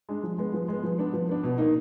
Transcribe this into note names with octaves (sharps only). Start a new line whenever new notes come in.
G#3 D4
F3
G#3 B3
F3
G#3 B3
F3
B3 D4
F3
B3 D4
B2
A#3 D#4